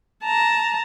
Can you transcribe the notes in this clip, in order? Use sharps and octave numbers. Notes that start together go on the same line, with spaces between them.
A5 A#5